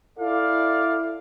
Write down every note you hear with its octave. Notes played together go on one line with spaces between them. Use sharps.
E4 A4 D5 F5